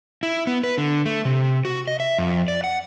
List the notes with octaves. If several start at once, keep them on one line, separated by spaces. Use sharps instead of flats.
E4
B3
B4
D3
A3
C3
F#4
D#5
E5
F2
D5
F#5